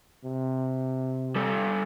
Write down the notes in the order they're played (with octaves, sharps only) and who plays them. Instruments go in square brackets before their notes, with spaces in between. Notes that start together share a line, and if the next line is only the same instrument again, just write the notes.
[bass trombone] C3
[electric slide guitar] G3 A4